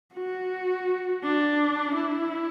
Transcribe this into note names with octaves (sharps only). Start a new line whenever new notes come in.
F#4
D4
E4